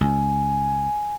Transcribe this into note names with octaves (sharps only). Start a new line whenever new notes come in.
C#2 G#5